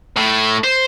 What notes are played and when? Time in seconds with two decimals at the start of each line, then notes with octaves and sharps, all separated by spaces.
0.16 A2
0.64 C5